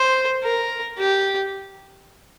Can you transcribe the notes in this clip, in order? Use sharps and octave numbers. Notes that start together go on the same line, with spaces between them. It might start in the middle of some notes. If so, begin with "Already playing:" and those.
Already playing: C5
A#4
G4